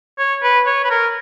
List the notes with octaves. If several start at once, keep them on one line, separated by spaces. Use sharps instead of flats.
C#5
B4
C#5
B4
A#4